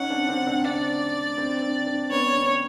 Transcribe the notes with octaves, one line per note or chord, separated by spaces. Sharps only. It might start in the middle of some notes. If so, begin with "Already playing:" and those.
Already playing: C#4 D#4 F#5
C4 D4
C4 D4
C4 D4
C4 D4 D5
C4 D4
C4 D4
C4 D4
B3 C#4 C#5
B3 C#4